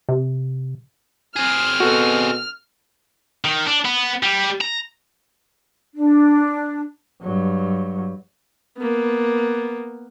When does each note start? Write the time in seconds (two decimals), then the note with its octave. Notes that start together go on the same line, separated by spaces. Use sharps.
0.09 C3
1.36 C4 G#4 F6
1.80 B2 F#4 A4
3.44 D#3
3.67 D4
3.85 B3
4.23 G3
4.61 A#5
5.95 D4
7.22 G2 F#3
8.78 A#3 B3